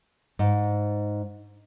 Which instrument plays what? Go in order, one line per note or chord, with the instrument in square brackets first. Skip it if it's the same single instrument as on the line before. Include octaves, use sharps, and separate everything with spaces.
[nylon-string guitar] G#2